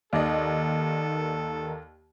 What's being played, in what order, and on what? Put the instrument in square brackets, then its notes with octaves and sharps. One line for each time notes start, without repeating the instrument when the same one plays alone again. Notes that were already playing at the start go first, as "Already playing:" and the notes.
[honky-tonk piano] D#2 D5 D#5 [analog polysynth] D#3 [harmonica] A4